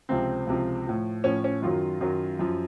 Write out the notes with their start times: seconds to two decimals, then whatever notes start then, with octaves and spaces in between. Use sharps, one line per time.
0.09 C#2 C3 F3 C4
0.47 C#2 C3 F3
0.86 A2 F3
1.24 A2 F3 C#4
1.44 C#4
1.62 F#2 D#3 F#3 F4
2.01 F#2 D#3 F#3
2.39 F#2 F3